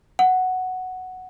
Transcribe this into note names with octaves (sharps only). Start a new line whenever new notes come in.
F#5